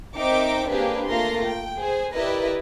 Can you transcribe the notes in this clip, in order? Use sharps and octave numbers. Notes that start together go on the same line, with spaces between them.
C4 D#4 A#4 E5 G5 D6
A#3 C4 D4 G4 G#4 B4
A3 A#3 F4 A#4 C6 A#6
G5
G#4 C5
E4 G4 A#4 B4 D5 D#5